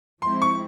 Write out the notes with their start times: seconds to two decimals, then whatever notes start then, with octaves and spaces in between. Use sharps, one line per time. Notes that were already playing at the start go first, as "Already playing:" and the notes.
0.22 F3 G#3 C4 E4 C6
0.42 C#6